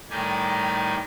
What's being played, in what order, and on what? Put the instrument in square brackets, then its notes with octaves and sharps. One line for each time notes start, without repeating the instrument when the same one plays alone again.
[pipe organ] A2 D#3 G3 D#4 G4 G#5